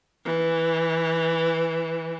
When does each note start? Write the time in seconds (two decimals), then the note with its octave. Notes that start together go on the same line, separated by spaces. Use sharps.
0.25 E3